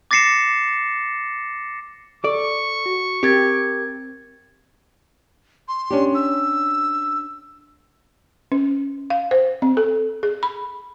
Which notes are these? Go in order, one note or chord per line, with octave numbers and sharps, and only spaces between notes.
D6 A6 A#6 C7 C#7 E7
A4 D5 C#6
F#4
C4 G4 A#4 G#6 A6
C6
C#4 D4 G4
E6
C#4
F5
C5
C4
A4
G#4
B5